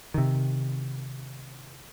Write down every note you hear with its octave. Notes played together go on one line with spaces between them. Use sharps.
C3 D#3